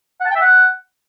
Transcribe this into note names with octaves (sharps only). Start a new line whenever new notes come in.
F#5
A5
G5
E5
F#5